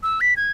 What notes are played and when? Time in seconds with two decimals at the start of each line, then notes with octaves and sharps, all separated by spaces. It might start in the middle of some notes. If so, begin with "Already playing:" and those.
0.03 E6
0.21 B6
0.36 G#6